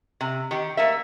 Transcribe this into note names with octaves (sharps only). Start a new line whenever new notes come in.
C3
D#3 G4
A3 A#3 E5